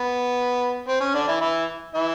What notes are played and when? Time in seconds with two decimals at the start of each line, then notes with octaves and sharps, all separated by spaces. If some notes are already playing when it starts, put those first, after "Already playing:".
Already playing: B3
0.88 C4
1.01 C#4
1.14 D3 D4
1.27 E3 E4
1.41 E3 E4
1.95 E3 E4